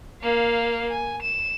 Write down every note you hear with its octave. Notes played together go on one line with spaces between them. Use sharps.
A#3 F5
G#5
E7